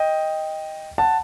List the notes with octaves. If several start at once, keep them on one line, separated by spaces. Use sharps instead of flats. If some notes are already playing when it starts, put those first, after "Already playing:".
Already playing: D#5 G5
F#5 A5